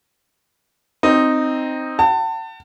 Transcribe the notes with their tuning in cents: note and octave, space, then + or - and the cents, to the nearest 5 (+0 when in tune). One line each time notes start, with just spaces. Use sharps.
C4 +0 D#4 -5
F#5 +35 A5 +30